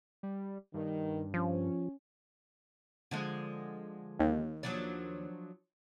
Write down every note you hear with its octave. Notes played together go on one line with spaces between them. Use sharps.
G3
G2 D#3
F3 C#4
D3 F3 G#3
D#2
F3 F#3 D4